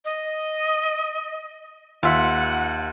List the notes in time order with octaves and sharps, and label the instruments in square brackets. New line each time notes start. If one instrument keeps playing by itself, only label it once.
[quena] D#5
[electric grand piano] D#2 [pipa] F4 E5 [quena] F#5